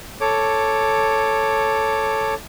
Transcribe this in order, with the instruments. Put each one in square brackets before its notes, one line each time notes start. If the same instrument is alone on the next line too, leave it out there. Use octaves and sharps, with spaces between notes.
[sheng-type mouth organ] A4 C#5 D6